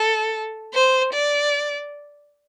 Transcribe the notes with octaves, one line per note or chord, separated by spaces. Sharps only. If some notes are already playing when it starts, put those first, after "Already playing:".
Already playing: A4
C5
D5